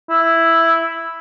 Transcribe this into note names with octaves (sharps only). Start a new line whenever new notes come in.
E4